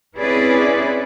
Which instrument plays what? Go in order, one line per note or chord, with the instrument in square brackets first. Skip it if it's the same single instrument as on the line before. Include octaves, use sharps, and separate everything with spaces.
[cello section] C4 C#4 E4 G#4 B4 D5